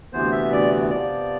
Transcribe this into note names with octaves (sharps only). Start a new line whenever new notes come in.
D2 C3 E3 B3 C5
E5
D5
C3 F3 B3 D5